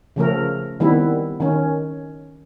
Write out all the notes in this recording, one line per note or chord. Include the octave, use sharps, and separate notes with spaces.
C#3 F3 A3 A#4
D#3 G3 B3 C4 E4
D#3 C#4